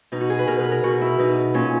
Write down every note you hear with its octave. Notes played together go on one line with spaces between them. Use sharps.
B2 D#4
F#4
G#4
B4
B2 A#4
B4
A#4
B2 F#4
E4
B2 D#4
A#2 C#4